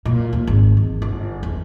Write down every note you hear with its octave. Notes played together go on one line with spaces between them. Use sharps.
A#2
D#2
G#1
E2
G1
E2